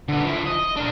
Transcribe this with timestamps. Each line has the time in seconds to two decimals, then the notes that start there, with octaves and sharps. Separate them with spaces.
0.08 D3 B4
0.24 F3 E4
0.46 D#5
0.76 D4 A#4